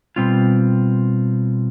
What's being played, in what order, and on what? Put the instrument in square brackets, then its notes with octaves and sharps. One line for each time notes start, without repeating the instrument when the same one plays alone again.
[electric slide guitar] B2 G3 C4 F4